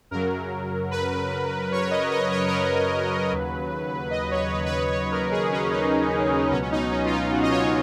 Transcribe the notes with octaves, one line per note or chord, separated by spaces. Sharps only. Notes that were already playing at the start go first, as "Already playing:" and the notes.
F#2 C#3 F#3 A#4
B4
C#5
D#5
D#5
C#5
A#4
B4
D#2 C#3 F#3
D#5
C#5
B4
B4
C#5
B4
C#5
A#4
G#4
C#4
D#4
C#2 B2 F#3 B3 C#4
C#4
D#4
C#4
F4
D#4
F#4
D#5
C#5